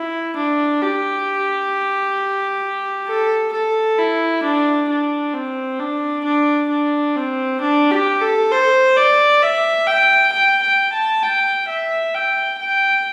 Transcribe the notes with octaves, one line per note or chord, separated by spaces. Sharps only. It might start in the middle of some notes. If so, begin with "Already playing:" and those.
Already playing: E4
D4
G4
A4
A4
E4
D4
D4
C4
D4
D4
D4
C4
D4
G4
A4
C5
D5
E5
G5
G5
G5
A5
G5
E5
G5
G5